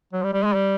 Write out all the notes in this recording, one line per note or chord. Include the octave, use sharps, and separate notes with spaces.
F#3
G3
G3
G#3
G3